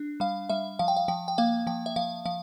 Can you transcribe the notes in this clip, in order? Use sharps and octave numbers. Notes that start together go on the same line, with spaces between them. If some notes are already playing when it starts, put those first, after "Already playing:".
Already playing: D4
G3 F5
G3 E5
F3 F5
G5
F5
F3 G5
G5
A#3 F5
F3 G5
E5
F3 F5
F3 F5